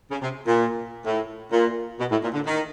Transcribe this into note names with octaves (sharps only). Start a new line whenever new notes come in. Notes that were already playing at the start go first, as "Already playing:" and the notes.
C#3
C3
A#2
A2
A#2
B2
A2
A#2
D3
D#3